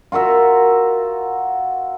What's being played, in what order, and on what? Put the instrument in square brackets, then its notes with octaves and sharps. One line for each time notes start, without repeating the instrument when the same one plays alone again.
[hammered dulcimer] F4 F#4 A#4 E5